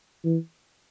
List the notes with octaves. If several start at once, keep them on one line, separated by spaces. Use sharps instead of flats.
E3